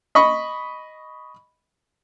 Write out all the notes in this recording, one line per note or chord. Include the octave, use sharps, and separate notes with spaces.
D#5 B5 C#6